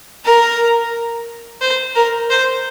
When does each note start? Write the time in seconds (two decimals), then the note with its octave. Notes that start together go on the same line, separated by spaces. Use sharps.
0.25 A#4
1.62 C5
1.96 A#4
2.30 C5